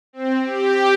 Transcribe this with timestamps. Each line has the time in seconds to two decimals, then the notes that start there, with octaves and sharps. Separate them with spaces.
0.13 C4
0.44 G4